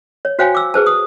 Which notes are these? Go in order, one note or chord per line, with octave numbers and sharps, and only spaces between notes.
C#5
F#4 C5 C#5 F5 G5 G#5
D6 E6
G#4 B4 C5 A5
D#6